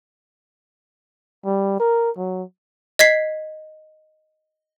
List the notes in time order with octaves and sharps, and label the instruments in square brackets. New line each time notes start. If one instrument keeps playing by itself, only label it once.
[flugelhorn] G3
A#4
F#3
[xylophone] D#5 G#6 B6 C7